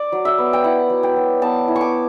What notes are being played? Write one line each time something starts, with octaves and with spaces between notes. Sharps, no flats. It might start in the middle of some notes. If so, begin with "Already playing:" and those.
Already playing: D5
F#3
E5
B3
G5
E4 F#5
F#3
G5
F#3
B3 A5
E4
C#6
D6